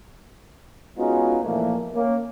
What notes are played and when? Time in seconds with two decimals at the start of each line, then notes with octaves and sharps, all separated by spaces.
0.98 G#3 B3 C#4 D#4 F4 F#4
1.44 A#2 E3 F3 A3 A#3
1.94 A#3 C#4